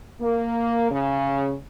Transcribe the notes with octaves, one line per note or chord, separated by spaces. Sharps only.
A#3
C#3